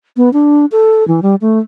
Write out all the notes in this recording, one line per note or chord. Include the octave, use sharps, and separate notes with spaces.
B3
D4
A4
E3
G3
A3